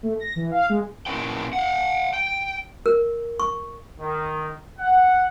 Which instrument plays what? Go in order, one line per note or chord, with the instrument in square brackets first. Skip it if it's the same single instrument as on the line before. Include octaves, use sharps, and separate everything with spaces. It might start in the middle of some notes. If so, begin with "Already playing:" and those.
[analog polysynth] A3
A#6
E3
F5
G#3
[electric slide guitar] A#2 C#4 E4 A#4 B4 G5
F5 F#5
G5
[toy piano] A#4
C#6
[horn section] D#3
F#5